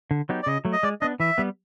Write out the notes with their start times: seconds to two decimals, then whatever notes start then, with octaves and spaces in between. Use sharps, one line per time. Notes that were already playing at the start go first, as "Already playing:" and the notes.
0.11 D3
0.29 F#3 B3 D#4 G4
0.43 D5
0.46 C#3 D#5
0.65 F#3 A3
0.73 D#5
0.83 G#3 D5
1.01 B3 D4 D#5
1.20 E3 E5
1.38 G3 B3